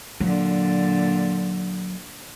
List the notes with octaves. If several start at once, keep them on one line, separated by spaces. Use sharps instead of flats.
A#2 D3 F#3